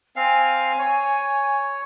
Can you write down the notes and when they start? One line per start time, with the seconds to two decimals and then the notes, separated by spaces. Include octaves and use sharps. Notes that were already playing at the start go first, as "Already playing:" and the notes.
0.16 C4 F5 G#5
0.79 C#5